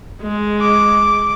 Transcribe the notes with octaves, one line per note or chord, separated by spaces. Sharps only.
G#3
D6